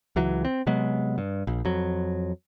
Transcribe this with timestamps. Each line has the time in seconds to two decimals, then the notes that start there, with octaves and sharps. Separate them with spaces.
0.16 C#2 E3 F#3
0.45 C4
0.67 C3 F#3 G#3 B3
1.18 G2
1.47 A#1
1.65 F2 F#3